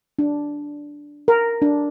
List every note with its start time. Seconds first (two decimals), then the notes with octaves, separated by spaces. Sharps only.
0.19 D4
1.28 A#4
1.62 D4